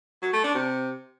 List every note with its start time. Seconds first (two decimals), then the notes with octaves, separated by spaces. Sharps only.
0.22 F#3
0.33 A3
0.44 D4
0.54 C3